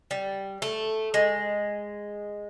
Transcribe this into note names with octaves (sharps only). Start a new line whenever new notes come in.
G3
A3
G#3